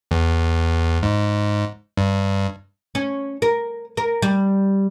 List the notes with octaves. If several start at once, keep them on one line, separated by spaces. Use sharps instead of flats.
E2
G#2
G2
C#4
A#4
A#4
G3